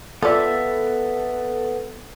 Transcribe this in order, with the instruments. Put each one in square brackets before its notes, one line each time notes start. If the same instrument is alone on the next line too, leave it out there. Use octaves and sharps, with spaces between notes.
[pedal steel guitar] B3 E5 [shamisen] F4 D5 [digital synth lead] A4